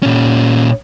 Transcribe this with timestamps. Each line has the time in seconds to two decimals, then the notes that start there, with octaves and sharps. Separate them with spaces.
0.03 A#2 C#4